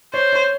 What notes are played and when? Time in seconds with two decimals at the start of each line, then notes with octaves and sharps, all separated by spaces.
0.14 C5 C#5
0.33 C#5